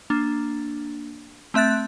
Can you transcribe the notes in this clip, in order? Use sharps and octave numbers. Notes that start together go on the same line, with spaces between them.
A#3 D4
A3 C4 E5 F#6 A6